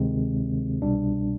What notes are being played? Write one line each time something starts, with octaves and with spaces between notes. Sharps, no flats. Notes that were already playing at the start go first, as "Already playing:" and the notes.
Already playing: D2 C3 D#3 G#3 C4
C2 B2 G3 D4